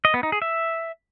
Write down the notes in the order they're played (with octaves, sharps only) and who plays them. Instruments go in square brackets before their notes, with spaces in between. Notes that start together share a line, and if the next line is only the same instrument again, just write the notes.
[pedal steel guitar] D#5
B3
D#4
G#4
E5